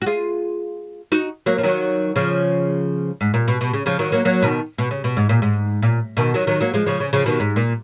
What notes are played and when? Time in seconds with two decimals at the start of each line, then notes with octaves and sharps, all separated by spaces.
0.02 F#4
0.06 F4 G#4
1.12 D#4 F#4
1.46 F#3 A#3
1.58 F3
1.63 D#3 F#3
2.16 C#3 F3
3.21 G#2
3.34 A#2
3.48 B2
3.61 B2
3.73 C#3
3.86 C#3 F3
3.99 D#3 F#3
4.12 F#3 A#3
4.25 F#3 A#3
4.42 B2 D#3
4.78 B2
4.91 C#3
5.04 B2
5.17 G#2
5.29 A#2
5.42 G#2
5.82 A#2
6.17 B2 D#3
6.34 D#3 F#3
6.47 D#3 F#3
6.61 F#3 A#3
6.74 F3 G#3
6.86 C#3 F3
7.00 C#3
7.13 C#3 F3
7.26 B2 D#3
7.40 G#2
7.56 A#2